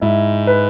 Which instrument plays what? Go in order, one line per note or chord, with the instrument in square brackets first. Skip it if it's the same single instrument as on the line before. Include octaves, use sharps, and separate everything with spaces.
[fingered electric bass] G#2 [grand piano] E4
[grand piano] B4